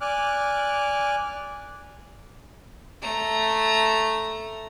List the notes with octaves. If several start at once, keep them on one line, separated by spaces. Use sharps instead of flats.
D5 G#5 D6 F6 F#6
A3 A#5